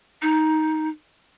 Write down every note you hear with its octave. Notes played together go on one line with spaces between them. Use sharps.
D#4